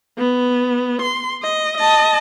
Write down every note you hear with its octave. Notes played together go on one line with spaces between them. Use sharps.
B3
C6
D#5
D#5 A5